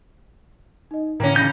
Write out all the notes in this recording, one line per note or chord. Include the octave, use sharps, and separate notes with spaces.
D#4 D#5
A2 D3 E3 A#3 C#4 G5 A#5
C#3 D#4 B5 G6 A#6